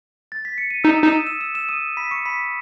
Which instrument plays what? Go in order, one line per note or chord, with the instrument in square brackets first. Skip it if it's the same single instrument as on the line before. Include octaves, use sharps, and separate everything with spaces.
[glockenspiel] A6
B6
C#7
D#7
[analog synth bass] D#4 [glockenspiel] E6 E7
[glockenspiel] D#6 D#7
[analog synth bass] D#4 [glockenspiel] E7
[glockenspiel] D#6 D#7
E6 E7
E6 E7
E6 E7
D#6 D#7
B5 B6
C#6 C#7
B5 B6